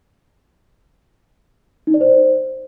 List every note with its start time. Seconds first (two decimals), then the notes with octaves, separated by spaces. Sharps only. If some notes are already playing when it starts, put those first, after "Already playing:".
1.87 D#4
1.94 D5
2.01 C5